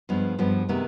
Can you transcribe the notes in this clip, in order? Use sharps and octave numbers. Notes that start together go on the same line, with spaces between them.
G2 F3 G#3 B3
G2 F3 G#3 B3
C3 D#3 G#3 B3